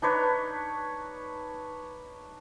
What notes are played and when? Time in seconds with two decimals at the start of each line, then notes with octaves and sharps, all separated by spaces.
0.02 D4 D#4 B4 C#5